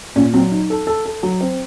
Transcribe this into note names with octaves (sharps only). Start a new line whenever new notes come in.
A#2 C#4
F#3 C4
D#4
A4
A4
A4
F#3
C4